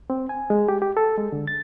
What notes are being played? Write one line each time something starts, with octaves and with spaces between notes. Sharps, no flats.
C4
G#5
G#3
G4
G4
A4
G#3
D3
A6